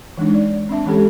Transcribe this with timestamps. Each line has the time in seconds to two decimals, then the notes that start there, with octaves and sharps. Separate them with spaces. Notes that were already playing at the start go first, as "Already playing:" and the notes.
0.17 E3 G#3 D4 D#4
0.34 D5
0.69 C4 D4 E5 A5
0.86 E3 G#3 C#4 G4 A4